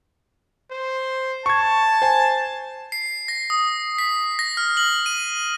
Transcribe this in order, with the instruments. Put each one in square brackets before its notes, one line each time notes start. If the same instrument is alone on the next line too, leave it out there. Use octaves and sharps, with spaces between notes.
[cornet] C5
[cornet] A5 [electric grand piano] C#6 G#6
[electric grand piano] C5 G#5
[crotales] C7
A#6
D#6
B6
A#6
F6
F#7
D#7